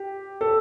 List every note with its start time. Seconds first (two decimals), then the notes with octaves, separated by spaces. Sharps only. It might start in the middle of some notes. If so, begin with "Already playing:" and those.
Already playing: G4
0.41 A4